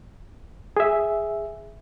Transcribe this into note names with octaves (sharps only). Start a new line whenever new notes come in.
G#4 E5